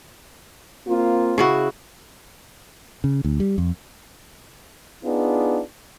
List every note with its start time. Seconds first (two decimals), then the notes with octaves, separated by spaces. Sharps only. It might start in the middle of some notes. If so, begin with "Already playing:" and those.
0.88 A#3 C4 F4
1.38 C#3 E4 F#4
3.04 C#3
3.25 D2
3.40 G3
3.58 F2
5.04 B3 D4 D#4 F4 G#4